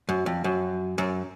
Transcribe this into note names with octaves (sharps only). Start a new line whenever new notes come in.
F#2
F2
F#2
F#2